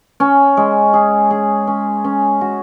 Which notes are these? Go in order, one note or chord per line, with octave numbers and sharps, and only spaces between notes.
C#4
G#3
G#4
G#4
C#4
C#4
F#4